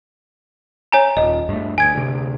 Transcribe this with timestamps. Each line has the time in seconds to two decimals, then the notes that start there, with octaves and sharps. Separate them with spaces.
0.92 C#5 G#5 A#5
1.17 D#1 D#5
1.49 G2 A3
1.78 D2 G#5 G#6 D7
1.95 D2 C3